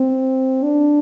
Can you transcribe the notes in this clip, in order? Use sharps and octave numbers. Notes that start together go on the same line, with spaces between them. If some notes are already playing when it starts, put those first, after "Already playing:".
Already playing: C4
D4